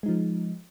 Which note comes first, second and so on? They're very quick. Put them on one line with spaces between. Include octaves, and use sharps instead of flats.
G#3 D#4 F3